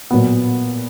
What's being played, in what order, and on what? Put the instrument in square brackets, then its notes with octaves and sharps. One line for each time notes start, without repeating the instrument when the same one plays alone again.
[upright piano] A#2 F#3 B3